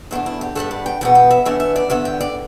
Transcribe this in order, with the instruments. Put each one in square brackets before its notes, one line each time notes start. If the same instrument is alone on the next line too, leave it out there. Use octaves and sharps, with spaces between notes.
[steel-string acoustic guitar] E2 B2 A3 D4 E5
E4
G4
G2 G3 B3 D4 A4
D5
G5
E2 B2 B3 G5
G5
E5
A2 E3 B3 D4 E5
E5
D5
G2 D3 B3 E5
G5
D5